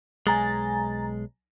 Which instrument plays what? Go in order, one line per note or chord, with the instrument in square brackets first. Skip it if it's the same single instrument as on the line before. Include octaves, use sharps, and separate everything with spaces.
[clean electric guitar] B1 G#3 [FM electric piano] G#5 A#5 A6